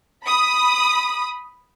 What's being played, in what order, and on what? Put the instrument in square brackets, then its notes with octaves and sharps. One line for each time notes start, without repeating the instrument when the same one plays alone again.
[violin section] B5 D#6